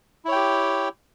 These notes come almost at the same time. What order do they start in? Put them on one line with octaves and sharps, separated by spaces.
E4 C#5 G5 G4